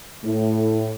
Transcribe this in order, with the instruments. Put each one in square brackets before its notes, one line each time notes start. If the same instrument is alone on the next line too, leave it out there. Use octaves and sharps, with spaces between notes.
[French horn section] A2